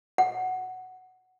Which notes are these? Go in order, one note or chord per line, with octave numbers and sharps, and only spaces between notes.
F#5